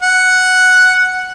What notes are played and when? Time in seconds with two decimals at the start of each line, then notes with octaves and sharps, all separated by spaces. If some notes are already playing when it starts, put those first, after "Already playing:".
0.02 F#5